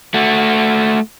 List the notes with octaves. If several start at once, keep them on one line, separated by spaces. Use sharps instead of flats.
A3 F#4